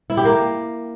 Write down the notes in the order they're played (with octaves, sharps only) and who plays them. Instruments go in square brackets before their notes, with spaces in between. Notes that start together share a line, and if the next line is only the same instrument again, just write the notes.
[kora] E4
G4
A#3